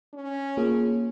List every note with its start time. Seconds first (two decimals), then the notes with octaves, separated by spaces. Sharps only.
0.14 C#4
0.57 A#3 F4 G#4